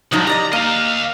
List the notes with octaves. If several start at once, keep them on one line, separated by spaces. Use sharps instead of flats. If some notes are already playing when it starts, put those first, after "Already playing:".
C2 F3 F#3 D#4
G4 D5 D#5 A#5
A#3 D#5 F5